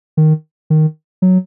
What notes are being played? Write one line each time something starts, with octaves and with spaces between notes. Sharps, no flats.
D#3
D#3
F#3